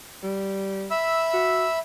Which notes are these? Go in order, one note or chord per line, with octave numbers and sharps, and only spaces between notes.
G3
E5 B5 E6
F#4